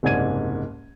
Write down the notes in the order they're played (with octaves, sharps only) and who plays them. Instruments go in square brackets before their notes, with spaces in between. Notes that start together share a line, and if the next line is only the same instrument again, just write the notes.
[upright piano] F#1 C2 G#2 D5 G#6 D#7